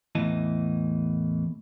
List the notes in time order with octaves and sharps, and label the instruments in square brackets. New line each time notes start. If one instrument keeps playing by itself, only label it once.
[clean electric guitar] E2 A2 E3 D#5 A5